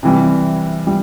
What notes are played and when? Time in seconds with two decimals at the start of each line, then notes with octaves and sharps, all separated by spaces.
0.03 C3 E3 G3
0.87 G3